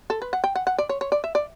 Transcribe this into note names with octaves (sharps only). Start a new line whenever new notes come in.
A4
B4
F#5
G5
F#5
F#5
D5
C#5
C#5
D5
E5
D5